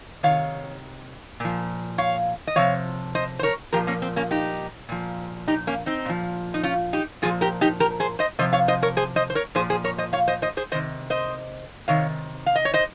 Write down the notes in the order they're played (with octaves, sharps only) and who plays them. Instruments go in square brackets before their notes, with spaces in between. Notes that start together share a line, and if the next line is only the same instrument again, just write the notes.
[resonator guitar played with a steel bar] C3 D#3 C#5 F5
A#2 F3
C#5 F5
D#5
C3 F3 C#5 F5
C5 D#5
C5
A#4 C#5
A#2 F3 G4 A#4
A#3 C#4
C4
A#3 C#4
D#4 G4
A#2 F3
D#4 G4
A#3 C#4
C4 D#4
A#2 F3
D#4
C#4 F4
D#4 G4
A#2 F3 F4 G#4
G4 A#4
D#4 G4
G4 A#4
G#4 C5
C5 D#5
C3 F3 C5 D#5
C#5 F5
C5 D#5
A#4 C#5
G#4 C5
C5 D#5
C5
A#4 C#5
A#2 F3 G#4 C5
G#4 C5
A#4 C#5
C5 D#5
C#5 F5
C5 D#5
C5 D#5
G#4 C5
C3 D#3 C5 D#5
C5 D#5
C3 D#3 C#5 F5
F5
D#5
C#5
C5 D#5